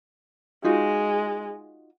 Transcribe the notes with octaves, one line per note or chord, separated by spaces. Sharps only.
G#3 D#4 F4 F#4